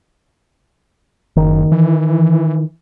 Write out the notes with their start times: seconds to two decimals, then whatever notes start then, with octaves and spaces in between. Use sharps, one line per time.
1.36 F#1 D#3
1.72 E3